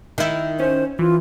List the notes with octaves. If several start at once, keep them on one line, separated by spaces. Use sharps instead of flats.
D#3 E4
C#4 C5
E3 F4